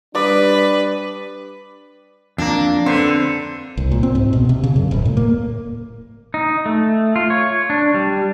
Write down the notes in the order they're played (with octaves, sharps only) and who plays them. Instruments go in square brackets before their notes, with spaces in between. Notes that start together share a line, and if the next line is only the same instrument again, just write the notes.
[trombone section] G3 D4 [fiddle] B4 [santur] D5 D#6
[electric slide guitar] F2 A#3 [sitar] D4
[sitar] D3 [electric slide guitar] C4 B4 C5
[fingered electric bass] C2
A#2
C4
G#2
B2
C3
C#3
F#2
D#1
A2
A#3
[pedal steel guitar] D#4
A3
F4
C#5
D4
G3